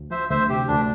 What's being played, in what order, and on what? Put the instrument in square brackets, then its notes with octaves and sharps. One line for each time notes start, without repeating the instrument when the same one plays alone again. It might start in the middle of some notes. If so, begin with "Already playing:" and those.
Already playing: [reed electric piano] D2
[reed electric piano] F3 [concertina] C5 E5
[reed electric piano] D2 [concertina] C5 E5
[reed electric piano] C3 [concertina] G4
[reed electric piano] D2 [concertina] D4